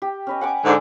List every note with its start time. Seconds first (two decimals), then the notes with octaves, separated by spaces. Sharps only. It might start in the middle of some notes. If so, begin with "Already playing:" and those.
0.02 G4
0.27 C#4 B4 D#5
0.41 F#5 G#5 D6
0.65 G#2 D3